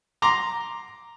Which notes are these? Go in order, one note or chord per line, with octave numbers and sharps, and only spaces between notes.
A#5 C6 D6